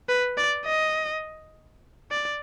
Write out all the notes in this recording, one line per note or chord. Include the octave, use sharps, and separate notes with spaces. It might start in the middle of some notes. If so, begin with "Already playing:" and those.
B4
D5
D#5
D5